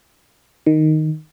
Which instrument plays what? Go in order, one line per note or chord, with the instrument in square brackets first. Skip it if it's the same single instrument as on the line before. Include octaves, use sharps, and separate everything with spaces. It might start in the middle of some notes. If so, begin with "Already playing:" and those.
[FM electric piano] D#3